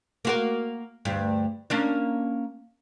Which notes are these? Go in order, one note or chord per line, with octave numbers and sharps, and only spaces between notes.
A#3 F#4 A#4
D2 G2
A#3 C#4 D4